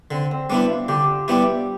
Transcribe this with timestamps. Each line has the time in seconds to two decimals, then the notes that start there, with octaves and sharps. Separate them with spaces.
0.11 D3 C4
0.31 C4
0.50 G3 B3 D4 E4
0.70 F4
0.88 D3 G4
1.28 G3 B3 E4 G4